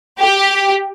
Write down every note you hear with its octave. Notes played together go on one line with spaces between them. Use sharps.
G4